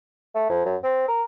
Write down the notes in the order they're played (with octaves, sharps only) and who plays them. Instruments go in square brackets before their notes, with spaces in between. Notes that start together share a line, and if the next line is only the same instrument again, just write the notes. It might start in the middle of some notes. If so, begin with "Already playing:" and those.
[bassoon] A3
F2
F#2
C4
A#4